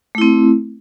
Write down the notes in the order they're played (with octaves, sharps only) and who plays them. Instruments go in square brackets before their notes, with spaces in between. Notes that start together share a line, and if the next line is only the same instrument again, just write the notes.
[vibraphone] A3
E4
C4